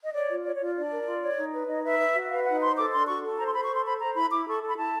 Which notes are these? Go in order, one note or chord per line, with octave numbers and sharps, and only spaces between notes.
D#5
C#5 D5
F4
C#5 D5
C#5
F4
D5
D4 D5
A#4
F4
C#5
D#4
B4
D#4 D#5
B4 E5
B4
F#4
B4 F5
D#4 F#5
C5 C6
A4 D6
D4 C6
F#4 C#6
A4
C5 A#5
C6
C5 B5
C#6
A4 C6
C5 B5
C5 A#5
E4 B5
E4 D6
A4 C#6
A4
B5
E4 A5